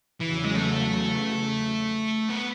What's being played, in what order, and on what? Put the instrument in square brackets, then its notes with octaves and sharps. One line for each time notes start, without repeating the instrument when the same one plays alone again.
[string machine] E2 C#3 F#3 [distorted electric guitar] E3
[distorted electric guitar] G#3
A3
B3